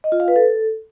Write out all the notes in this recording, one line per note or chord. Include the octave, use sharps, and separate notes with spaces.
D#5
F4
F5
B4
A4